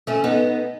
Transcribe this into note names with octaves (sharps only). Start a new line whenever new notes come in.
A3 C#4
B3 D#4